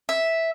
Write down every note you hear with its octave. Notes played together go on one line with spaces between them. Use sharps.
E5